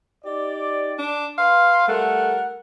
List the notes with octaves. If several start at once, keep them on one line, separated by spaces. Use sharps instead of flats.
D#4 G4 D5
D4
B4 F5 C6
G3 A3 A#4 F#5